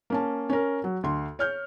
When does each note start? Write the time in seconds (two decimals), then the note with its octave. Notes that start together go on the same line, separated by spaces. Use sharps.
0.10 A#3 C#4 A5
0.50 C#4 A#4
0.84 F#3
1.03 D2 C6
1.39 C#5 F6 G6